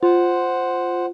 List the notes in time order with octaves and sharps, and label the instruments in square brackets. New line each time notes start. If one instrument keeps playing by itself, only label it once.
[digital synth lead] F4 [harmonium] C5 F#5